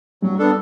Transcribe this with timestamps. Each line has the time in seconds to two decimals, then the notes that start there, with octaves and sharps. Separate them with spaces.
0.22 G2 F#3 G3
0.39 B3 D4 A4